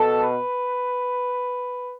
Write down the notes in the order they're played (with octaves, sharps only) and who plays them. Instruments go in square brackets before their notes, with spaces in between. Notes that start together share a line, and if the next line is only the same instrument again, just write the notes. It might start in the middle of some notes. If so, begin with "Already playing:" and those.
Already playing: [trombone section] B2 A4
B4